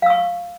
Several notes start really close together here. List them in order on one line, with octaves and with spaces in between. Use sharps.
F5 E6 C#6